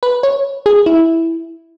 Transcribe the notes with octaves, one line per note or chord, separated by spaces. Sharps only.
B4
C#5
G#4
E4